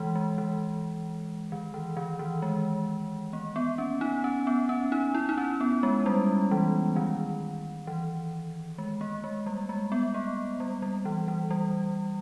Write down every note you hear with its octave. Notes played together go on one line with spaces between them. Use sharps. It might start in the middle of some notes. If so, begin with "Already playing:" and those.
Already playing: E3 G#3
G#3
E3
D#3
E3
D#3
E3
G#3
A#3
B3
C#4
D#4
C#4
B3
C#4
D#4
E4
D#4
C#4
B3
G#3
G3
E3
D#3
E3
G#3
A#3
G#3
G3
G#3
B3
A#3
G3
G3
E3
E3
G3